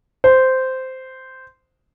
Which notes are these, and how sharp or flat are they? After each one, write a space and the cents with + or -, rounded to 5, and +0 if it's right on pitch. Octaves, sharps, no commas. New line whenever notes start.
C5 -10